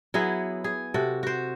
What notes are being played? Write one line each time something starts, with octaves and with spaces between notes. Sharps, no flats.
F#3 B3 E4 G#4
G#4
C3 F#4 A4
F#4 C5